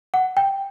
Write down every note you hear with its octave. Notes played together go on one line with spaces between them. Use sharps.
F#5
G5